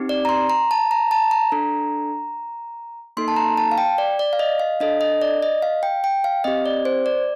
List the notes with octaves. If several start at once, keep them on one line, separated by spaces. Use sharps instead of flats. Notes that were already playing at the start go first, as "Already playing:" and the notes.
Already playing: C4 D#4 G4
D5
A#5
C6
A#5
A5
A#5
A5
A#5
D4 A4
A#3 D#4 A4 C6
A5
A#5
A5
F5
G5
D5
D5
F5
D#5
F5
D4 A4 D#5
D#5
D5
D#5
F5
G5
G5
F5
C4 G4 D#5
D5
C5
D5